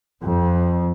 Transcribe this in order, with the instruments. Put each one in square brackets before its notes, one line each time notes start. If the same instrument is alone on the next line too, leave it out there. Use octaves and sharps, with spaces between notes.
[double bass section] F2